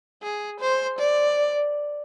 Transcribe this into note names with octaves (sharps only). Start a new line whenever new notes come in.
G#4
C5
D5